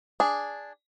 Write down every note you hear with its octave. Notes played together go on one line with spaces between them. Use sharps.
D4 G#4